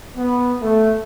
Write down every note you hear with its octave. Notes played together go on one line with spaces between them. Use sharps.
B3
A3